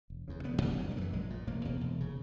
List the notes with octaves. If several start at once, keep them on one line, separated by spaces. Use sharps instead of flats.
E1
E2 C#3
E1 B3
E2 B2 A#3
F#1 F#3
D#3
F#2 C#3 E3
A#1 G#3
A#2
E1 A#3
E2 B2
E1
C#3